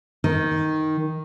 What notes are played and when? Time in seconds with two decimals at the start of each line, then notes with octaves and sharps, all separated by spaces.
0.24 D#3